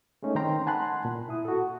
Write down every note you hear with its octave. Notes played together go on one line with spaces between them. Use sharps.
G#3 A3 C#4 D#4
D#3 C4 A#4 G5 A#5 C6
F#5 G#5 A5 B5 C6 F#6
A#2
E4 D#6
F#4 A4